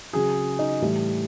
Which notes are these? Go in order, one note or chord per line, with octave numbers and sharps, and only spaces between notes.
C#3 F#3 G#4
D#4
A2 E3 G3